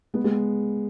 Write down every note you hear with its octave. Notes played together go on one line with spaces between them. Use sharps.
G#3 B3
G#3 B3